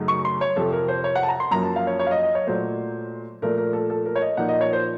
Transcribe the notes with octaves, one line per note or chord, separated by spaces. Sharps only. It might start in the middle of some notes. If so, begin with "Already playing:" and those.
Already playing: F#2 C#3 F#3 A3 D#4
C#6
C6
C#5
F2 C3 F3 A4
A#4
C5
C#5
F#5
A5
A#5
C6
F#2 F3 A#3 A#5
A5
F5
C#5
C#5
F5
D#5
D#5
C#5
A#2 F#3 A3 C5
A#2 F3 A3 A#4
A#4
A4
A4
A#4
C#5
D#5
A#2 F3 A#3 D#4 F#5
D#5
C#5
C5